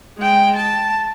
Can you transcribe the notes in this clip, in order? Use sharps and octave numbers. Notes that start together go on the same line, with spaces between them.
G#3 G5
A5